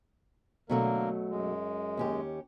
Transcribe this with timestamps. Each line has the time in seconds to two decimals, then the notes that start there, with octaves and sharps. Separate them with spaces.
0.69 B2 D3 F#3 A3 A#3 A#4
1.30 F#2 G#3
1.97 D#2 C#4 G4